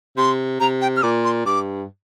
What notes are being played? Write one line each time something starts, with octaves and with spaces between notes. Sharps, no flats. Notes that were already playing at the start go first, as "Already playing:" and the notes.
C3 C6
C3 A#5
G5
F6
A#2 D6
C6
G2 D6